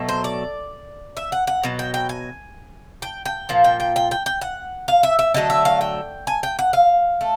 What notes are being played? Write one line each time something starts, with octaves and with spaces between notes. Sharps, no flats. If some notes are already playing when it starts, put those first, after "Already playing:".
Already playing: B2 F#3 A3
C5
D5
E5
F#5
F#5
B2 F#3
G5
G5
G#5
G5
G5
A#2 F3
G5
G5
G5
G5
G5
F#5
F5
E5
E5
D3 F#3 A3 D#5
E5
F5
G5
G#5
G5
F#5
F5
A3